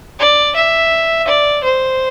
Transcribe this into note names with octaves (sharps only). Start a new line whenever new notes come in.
D5
E5
D5
C5